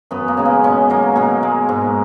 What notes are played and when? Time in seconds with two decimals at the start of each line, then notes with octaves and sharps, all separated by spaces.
0.11 F#2 B3
0.28 A#3
0.37 C#3 G#3
0.45 B3
0.64 B2 C#4
0.90 F#3 A#3
1.16 B2 A#3
1.43 G#3
1.69 G#2